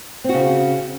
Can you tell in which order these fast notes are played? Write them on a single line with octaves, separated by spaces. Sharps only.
C4 F#4 C#3